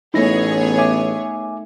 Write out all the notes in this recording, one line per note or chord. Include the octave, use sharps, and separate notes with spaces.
A1 A3 B3 D#4 E4 G#4 C#5 A#6
E5 G#5 D6